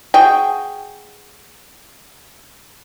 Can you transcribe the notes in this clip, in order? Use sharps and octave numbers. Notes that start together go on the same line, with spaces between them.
F#4 G#4 G5